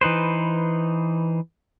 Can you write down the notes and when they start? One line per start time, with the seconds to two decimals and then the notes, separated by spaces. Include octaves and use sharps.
0.01 E3 D#4 B4 C5